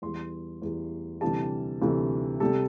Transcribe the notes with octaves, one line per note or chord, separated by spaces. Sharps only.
E2 E3 G3 C6
E2 E3 G3
D2 C3 E3 G3 A5
D2 C3 E3 G3
C3 G3 A4